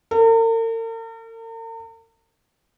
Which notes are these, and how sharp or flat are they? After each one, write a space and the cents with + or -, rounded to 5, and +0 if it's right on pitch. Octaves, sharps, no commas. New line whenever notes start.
A#4 -45